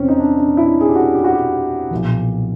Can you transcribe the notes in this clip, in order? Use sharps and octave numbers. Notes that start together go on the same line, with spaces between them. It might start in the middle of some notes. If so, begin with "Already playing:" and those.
Already playing: E2 C3 E3 C4 C#4
D#4
D4
D4
E4
G#4
G4
F#4
G4
F#4
G4
B1 A#2 F3